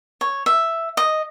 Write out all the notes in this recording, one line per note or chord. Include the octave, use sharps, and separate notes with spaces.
C#5
E5
D#5